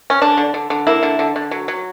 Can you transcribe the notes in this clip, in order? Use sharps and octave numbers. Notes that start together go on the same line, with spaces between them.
C#4
D3 D4
D3
D3
D3
A#3 E4
D3
D3
D3
F#3
F#3